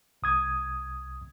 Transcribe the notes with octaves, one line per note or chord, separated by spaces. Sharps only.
C2 D#6 G#6